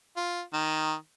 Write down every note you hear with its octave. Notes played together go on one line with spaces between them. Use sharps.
F4
D#3